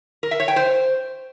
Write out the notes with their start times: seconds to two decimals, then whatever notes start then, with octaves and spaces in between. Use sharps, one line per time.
0.23 A#4
0.31 E5
0.40 C#5
0.48 G5
0.56 C5